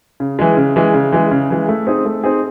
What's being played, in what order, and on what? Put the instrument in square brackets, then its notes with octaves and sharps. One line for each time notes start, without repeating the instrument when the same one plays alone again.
[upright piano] C#3
E3 G#3
C#3
E3 G#3
C#3
E3 G#3
C#3
E3 G#3
A3
C4 D#4 G#4
A3
C4 D#4 G#4